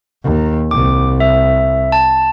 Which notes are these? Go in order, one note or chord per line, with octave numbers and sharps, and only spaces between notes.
D#2
C2 D6
E5
A5